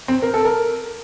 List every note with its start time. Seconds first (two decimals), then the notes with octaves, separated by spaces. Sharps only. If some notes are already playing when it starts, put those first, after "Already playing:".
0.08 C4
0.22 A#4
0.34 A4
0.45 A#4